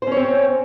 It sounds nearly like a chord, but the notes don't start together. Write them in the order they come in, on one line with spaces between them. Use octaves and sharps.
C5 C#4 C#5 C4